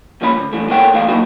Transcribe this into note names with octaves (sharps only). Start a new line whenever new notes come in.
G#2 F3 A#3 C#4 A#4 B5
D2 G2
G2 E3 A3
B3 A4 A#4 C#5 F#5 G5
C#2 E3 A3 B3 F5
F#3 A#3 B3 D#4 E4 F#4